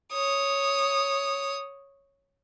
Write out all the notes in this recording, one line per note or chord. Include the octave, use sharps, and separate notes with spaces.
C#5 D#6